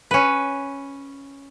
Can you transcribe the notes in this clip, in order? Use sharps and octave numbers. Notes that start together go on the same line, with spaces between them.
C#4 B4